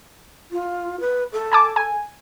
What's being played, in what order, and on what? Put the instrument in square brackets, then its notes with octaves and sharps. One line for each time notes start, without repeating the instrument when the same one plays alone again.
[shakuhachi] F4
B4
A4
[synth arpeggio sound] G#5 A5 D6
G#5